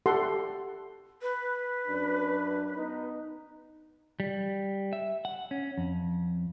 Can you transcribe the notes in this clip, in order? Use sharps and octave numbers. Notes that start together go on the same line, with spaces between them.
G4 A4 F#5 C6
B4
F#2 D4
B3 D#4
G3
E5
F#5
C#4
F2